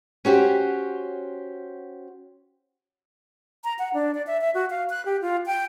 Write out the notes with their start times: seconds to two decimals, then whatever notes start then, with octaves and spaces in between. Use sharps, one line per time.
0.25 C#4 F#4 G4 C5
3.64 A#5
3.79 F#5
3.94 D4
4.15 D5
4.27 E5
4.41 E5
4.54 F#4
4.70 F5
4.90 F#6
5.05 G4
5.22 F4
5.46 G5